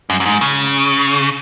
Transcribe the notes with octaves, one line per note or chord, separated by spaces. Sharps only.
F#2
F#2
G#2
C#3